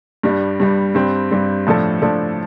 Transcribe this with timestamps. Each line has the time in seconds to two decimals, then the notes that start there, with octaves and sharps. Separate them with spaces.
0.23 G2 G3 D4
0.60 G2 G3 D4
0.95 G2 G3 C4
1.31 G2 G3 C4
1.67 A2 F3 D4 A4
2.02 A2 F3 D4 A4